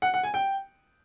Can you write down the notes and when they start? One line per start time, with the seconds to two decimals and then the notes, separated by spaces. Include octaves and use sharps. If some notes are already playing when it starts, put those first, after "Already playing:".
0.02 F#5
0.14 F#5
0.23 G#5
0.34 G5